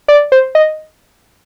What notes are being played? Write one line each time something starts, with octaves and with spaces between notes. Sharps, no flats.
D5
C5
D#5